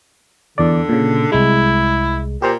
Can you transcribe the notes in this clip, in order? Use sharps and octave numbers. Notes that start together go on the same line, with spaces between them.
E2 D3 D5
A#2 C#3
C2 G#3 E4
A#2 G4 C5 A#5